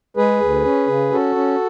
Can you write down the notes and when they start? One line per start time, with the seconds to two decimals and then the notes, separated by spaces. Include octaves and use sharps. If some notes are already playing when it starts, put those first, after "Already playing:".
0.17 G#3 G#4 B4
0.41 D2
0.64 C#4
0.88 C#3
1.11 C#4 F#4 A4
1.36 C#4